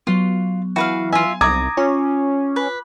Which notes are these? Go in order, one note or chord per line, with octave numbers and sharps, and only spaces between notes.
F#3 B3 F4
E3 F#4 B4 F5
F4 E5 G#5
C2 A#5 D6 D#6 G#6
C#4 F4
B4